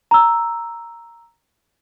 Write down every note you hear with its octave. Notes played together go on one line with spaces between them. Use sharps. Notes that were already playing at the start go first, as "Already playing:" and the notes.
A#5 E6